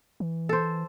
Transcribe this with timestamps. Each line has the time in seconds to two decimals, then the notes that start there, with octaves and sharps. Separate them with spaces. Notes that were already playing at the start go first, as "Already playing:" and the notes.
0.20 E3
0.49 A4 C5